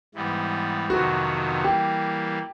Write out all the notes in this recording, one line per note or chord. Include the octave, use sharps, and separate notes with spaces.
G#2 E3 G3 B3
F2 C3 D#3 F#3 B3 F#4
E3 G3 A#3 G4